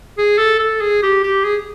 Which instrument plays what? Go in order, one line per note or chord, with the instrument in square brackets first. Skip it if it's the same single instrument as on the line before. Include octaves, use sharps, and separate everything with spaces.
[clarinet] G#4
A4
A4
G#4
G4
G4
G#4